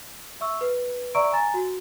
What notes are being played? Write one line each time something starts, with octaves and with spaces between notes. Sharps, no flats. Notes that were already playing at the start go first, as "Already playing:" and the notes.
E5 C#6 E6
B4
D5 E5 A#5 C#6 E6 D7
G#5 A#5 A6
F#4